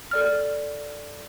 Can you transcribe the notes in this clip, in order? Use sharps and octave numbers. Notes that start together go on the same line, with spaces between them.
A4 D5 F6